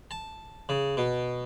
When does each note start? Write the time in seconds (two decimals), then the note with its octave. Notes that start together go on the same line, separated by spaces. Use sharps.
0.11 A5
0.69 C#3
0.97 B2